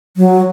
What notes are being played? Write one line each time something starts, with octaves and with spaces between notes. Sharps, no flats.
F#3